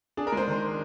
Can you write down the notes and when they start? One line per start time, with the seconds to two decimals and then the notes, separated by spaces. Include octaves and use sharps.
0.17 D4 G#4
0.27 A#4
0.32 G#3 C5
0.48 D#3